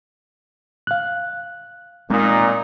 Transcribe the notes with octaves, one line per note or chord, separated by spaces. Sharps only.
F5 F#6
A#2 G#3 C4 D#4